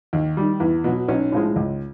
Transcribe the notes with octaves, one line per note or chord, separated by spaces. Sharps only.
D#2
D#3 G3
E2
B2 F#3
B1 C#4
A2 F3 G#3
C#2